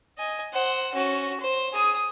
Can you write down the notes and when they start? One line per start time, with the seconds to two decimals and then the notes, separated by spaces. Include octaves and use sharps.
0.18 D#5 G#5
0.53 C5 F#5
0.94 C#4 F#4
1.40 C5
1.73 G#4 D#6